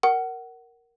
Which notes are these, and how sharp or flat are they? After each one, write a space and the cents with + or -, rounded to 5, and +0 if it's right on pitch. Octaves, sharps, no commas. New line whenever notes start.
A#4 +0 F#5 +20